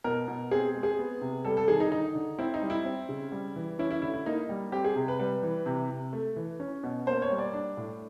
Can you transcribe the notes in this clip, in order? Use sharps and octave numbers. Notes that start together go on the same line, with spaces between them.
B2 A#4
B2
C4 G#4
G#3
G#4
B3
C3
G3 A4
A4
D#3 G#4
D#4
D3 D#4
D3
C4 E4
D#4
G3
E4
C4
C#3
G3
E3
C#4 E4
E4
D3 E4
E4
A#3 D#4
G3
C4 G4
G#4
C3
B4
G3 B4
E3
C3
C3
A3
E3
C#4
B2
A#3 C5
C#5
G3
D5
D4
A2